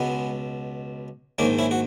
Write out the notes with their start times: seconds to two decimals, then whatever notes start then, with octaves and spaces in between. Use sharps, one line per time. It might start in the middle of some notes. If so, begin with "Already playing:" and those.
Already playing: C#2 B2 G#3 B3
1.38 A#1 G#2 D#3 A#3 C#4
1.59 C#4 E4
1.71 F#4